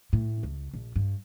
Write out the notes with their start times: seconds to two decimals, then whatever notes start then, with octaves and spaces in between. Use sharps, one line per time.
0.13 A2
0.43 C#2
0.74 A#1
0.96 G2